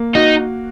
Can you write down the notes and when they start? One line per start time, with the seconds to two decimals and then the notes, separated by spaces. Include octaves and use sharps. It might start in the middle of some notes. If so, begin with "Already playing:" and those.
Already playing: A#3
0.15 D#4 F#4